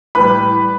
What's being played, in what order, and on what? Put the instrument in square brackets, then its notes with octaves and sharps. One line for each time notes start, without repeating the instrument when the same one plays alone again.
[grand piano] A2 E3 G3 B4 B5